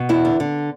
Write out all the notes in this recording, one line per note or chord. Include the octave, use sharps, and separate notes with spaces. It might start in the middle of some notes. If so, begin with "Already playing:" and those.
Already playing: B2
E2 E4
D3
D3